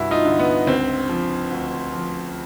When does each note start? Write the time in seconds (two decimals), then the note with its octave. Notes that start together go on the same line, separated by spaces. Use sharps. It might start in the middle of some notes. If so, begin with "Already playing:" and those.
Already playing: C2 G2 E4 F#4
0.11 D#4 F4
0.25 D3
0.39 B3
0.67 C#2 C4
1.09 F3
1.51 D2
1.93 F3